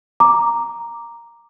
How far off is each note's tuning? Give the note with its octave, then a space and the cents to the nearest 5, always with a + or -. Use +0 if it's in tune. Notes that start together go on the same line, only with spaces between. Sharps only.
A#5 +0 D6 +0